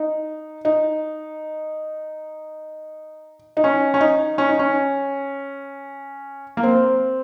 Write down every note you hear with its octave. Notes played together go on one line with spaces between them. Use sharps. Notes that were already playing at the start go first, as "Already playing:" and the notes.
Already playing: D#4
D#4
D#4
C#4
C#4
D#4
C#4
D#4
C#4
A#3
C4